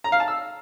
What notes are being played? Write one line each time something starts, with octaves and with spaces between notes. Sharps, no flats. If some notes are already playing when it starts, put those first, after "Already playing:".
A#5
F5
A5
E6